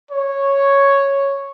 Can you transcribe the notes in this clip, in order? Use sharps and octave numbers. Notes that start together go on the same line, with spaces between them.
C#5